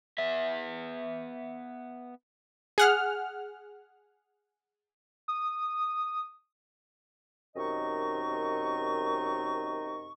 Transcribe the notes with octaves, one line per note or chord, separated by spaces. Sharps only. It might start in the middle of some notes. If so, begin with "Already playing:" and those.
B3 E5
G#4 F#5 F6
D#6
F#2 C3 D#3 D#4 D#5 C#6